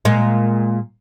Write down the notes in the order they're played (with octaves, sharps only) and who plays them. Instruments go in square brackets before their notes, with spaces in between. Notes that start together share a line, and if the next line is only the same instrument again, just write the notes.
[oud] A#2 G#3